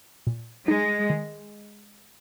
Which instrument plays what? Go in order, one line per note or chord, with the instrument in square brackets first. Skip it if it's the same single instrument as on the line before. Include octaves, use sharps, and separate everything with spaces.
[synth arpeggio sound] A#2
[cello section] G#3 [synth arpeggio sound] D#4
[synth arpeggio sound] D#3